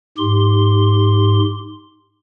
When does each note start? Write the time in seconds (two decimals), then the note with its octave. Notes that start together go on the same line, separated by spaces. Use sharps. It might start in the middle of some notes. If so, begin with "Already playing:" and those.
0.18 G#2 G4 C6